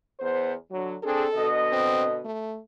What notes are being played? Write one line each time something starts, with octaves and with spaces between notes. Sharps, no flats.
E2 B3 C5
D3 F#3
C4 D4 G#4 A4
B2 D3 D#5
C4
A3